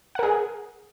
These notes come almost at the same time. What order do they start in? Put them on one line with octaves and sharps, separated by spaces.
F#5 A#4 G#4